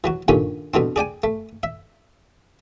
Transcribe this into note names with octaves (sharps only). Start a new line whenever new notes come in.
E3 F#3 F#4
G2 A#2 D3 D#3 C#4
B2 D3 E3 C4
G#4 D5 G5 G#5
A3
E5